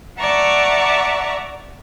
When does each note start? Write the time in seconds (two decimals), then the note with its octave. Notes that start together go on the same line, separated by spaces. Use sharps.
0.19 D5 E5 F#5 A5 A#5 C#6